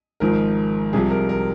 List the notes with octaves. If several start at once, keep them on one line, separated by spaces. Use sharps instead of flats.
G#1 G#2 F3 A#4
C2 C3 F3 G#4
A#4
A#4